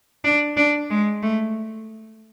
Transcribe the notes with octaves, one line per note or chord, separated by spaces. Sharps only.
D4
D4
G#3
A3